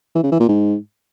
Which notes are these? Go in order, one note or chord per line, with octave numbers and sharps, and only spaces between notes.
E3
C#3
E3
A#2
G#2